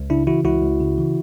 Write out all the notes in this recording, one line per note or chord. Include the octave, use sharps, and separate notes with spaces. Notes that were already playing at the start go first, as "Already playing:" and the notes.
Already playing: C#2
C#3 D4 E4
E3 E4 F#4
C#2 E4 F#4
C#2
C#3
E3